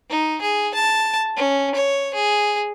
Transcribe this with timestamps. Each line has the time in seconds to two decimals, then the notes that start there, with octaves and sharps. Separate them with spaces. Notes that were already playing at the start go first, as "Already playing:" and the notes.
0.10 D#4
0.41 G#4
0.75 A5
1.37 C#4
1.75 C#5
2.14 G#4